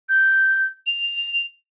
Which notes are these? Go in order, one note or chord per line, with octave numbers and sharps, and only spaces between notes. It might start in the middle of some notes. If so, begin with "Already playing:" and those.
G6
F7